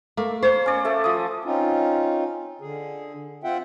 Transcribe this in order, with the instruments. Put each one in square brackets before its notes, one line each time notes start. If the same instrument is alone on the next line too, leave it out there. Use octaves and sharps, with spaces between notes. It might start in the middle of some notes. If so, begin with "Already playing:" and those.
[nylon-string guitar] A3 [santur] A#3
[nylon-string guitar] C5 [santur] C#5
[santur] C#4 D5
A3 A4 A5
F3 D#6
[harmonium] C4 C#4 D#4 F4
D3 G#4
C4 F4 E5 F#5 G5